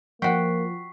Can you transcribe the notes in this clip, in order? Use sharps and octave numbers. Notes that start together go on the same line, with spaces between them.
F3 A#3 F#4 G5 C#6 B6 C7